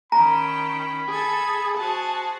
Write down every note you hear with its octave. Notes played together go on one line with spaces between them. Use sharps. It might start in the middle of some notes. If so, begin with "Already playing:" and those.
D#3 C#4 G5 A#5 B5
G#4 A4 G#6
F#4 G#4 C5 A5